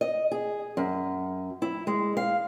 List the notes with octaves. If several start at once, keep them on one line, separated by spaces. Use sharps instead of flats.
D#5
G#4
F#2
E4
G#3
F5